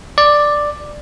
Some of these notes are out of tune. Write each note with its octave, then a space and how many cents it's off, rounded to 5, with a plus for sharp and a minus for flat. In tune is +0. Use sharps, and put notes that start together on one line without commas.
D5 +5